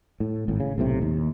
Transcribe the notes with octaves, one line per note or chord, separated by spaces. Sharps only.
A2
G#1 A2
C#3
B1 A2 C3
D#2